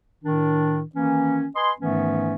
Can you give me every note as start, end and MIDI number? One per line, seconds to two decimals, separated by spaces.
0.24 0.82 45
0.24 0.82 51
0.24 0.82 62
0.95 1.47 51
0.95 1.47 52
0.95 1.47 58
0.95 1.47 61
1.56 1.72 71
1.56 1.72 75
1.56 1.72 80
1.56 1.72 84
1.79 2.35 44
1.79 2.35 51
1.79 2.35 52
1.79 2.35 57
1.79 2.35 59
1.79 2.35 61